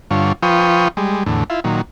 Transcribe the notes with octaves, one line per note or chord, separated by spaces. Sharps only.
G2 D3 F4 C#5
F3 F4 B4 G5 C#6 D#6
G3 G#3
E2 A2 D3
E4 F4
A#2 D#3 F#3